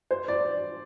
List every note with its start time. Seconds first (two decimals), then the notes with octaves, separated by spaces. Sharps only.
0.11 C5
0.28 D5